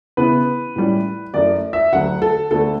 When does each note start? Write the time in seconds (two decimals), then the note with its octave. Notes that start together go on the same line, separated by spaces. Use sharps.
0.17 C#3 E3 B3 E4 B4
0.76 A2 E3 G3 C#4
1.34 F#2 E3 A3 D5
1.73 E5
1.93 D2 D3 F#3 F#5
2.22 A4
2.51 D2 D3 A3 A4